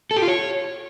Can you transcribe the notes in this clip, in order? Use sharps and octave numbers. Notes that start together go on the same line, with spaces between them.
A4
G4
F4
C#5